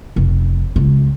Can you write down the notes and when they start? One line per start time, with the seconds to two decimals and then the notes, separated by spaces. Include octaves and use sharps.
0.16 F1
0.76 C#2